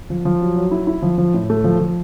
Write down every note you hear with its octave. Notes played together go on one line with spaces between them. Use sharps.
F3
F3
F#3
F#3
E4
E4
F3
F3
A2
A3
F3
F3